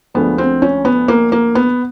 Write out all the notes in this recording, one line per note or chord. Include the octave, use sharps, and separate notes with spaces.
D2 D3 F3 G#3 B3
C4
C#4
B3
A#3
A#3
B3